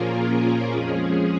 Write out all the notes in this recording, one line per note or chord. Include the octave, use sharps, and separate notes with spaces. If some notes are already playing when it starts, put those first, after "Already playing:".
Already playing: A#2 F3 A#3 C#4 F4 G#4 A#4
G#4
F2 F3 G#3 C#4 G#4